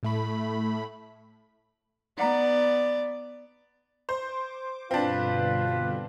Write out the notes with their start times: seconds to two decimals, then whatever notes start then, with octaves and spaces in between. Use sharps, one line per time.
0.03 A2 A3 B5
2.18 B3 D#4 D5 F#5 A#5
4.09 C5 D6
4.91 G2 B2 D3 C4 D4 F4 B4